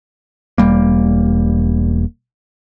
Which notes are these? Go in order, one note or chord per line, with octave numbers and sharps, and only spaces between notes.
E1 G3 A#3